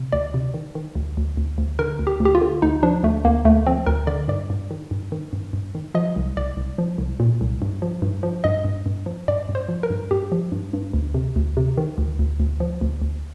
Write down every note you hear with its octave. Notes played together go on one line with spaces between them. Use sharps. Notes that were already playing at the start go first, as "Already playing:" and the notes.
Already playing: C3
D2 D5
C3
D#3
D#3
D2
D2
D2
D2
D3 A#4
D2
G4
D2
G4
F4
D3
D2 D#4
F3 D4
D2 A3
D2 A#3
D2 A3
F3 C4
D2 A#4
D3 D5
G2 D5
G2
D#3
G2
D#3
G2
G2
D#3
F3 D#5
C2
C2 D5
C2
F3
C2
A#2
C2
G2
F3
G2
F3
G2 D#5
G2
G2
F3
G2 D5
G2
C5
F3
A#4
G2
G2 G4
F3
G2
G2
D2
C3
D2
C3
D#3
D2
D2
D2
F3
D2
D2